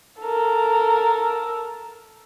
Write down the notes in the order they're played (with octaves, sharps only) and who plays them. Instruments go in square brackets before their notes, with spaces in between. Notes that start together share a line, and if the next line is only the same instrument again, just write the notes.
[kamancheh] A4 A#4